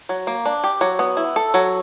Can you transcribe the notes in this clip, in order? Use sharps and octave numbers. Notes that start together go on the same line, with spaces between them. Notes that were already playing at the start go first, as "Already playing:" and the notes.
F#3
A#3
D4
G4
F#3
B3
E4
A4
F#3